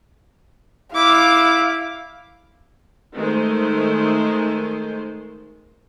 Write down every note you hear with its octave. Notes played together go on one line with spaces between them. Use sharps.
E4 F5 D6
D#3 G#3 A3 C5